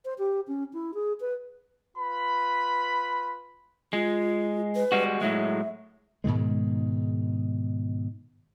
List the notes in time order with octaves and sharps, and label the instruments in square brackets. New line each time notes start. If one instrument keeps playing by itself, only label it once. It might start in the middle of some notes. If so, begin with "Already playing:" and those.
[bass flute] C5
G4
C#4
E4
G#4
B4
[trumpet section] F4 B4 B5
[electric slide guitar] G#3 [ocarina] F4
[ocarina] B4
[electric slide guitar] G3 G#3 F#4
[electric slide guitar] A2 F#3 G#3 [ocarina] E5
[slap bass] G#2 B2 D#3 G#3